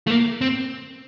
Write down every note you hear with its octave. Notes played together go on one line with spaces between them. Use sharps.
A3
A#3
C4